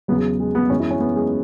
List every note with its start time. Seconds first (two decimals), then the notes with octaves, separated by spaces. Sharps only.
0.08 E2 C#3 F#3 B3
0.40 G#3
0.55 B3
0.70 F#2 E3 G#3 C#4
0.80 E4
0.91 C#4
1.01 B3
1.16 G#3